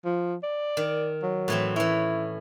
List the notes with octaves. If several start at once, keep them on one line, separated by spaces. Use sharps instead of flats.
F3
D5
D#3
F#3
A2 E3 C4
E3 C#4 E4